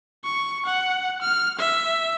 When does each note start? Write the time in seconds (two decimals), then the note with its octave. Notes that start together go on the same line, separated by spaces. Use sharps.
0.24 C#6
0.66 F#5
1.22 F6
1.59 E5